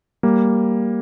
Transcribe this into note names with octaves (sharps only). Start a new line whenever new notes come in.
G3 A#3